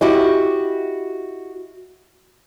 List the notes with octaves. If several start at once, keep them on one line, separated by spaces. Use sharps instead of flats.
E4 F#4 G4 D#5